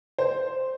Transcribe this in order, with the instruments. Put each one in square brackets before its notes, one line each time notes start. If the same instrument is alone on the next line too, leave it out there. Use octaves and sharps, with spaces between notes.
[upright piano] C5